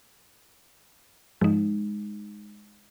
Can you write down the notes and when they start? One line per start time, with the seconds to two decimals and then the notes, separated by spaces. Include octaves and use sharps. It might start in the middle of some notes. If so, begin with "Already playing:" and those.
1.41 G#2 F3 G#3 D#4